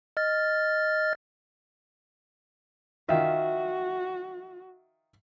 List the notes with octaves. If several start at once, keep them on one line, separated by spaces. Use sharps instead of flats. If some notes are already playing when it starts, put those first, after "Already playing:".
D#5 F6 A6
D#3 F4 F#4 E5